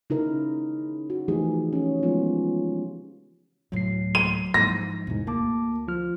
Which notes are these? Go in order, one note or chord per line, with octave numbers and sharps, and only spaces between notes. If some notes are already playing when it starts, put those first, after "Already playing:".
C#3 D#4 E4 A#4
F#4
E3 F3 A3 D#4 G4 G#4
C#4 G#4
F3 G#3 B3 F4
D2 A2 F#3 C7
D#7
G#2 F3 A#6
E2 G#2 B2 E4
D2 A#3 A5 D6
F3 F4 F6